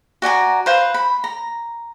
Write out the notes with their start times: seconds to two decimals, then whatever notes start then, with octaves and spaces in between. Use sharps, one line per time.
0.22 F#4 D5 G#5 A#5
0.66 B4 C5 F5
0.94 B5
1.24 A#5